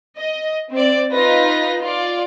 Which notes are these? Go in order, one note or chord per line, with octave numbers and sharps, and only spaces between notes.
D#5
C4 D5
D#4 F4 B4 A#6
F4 D5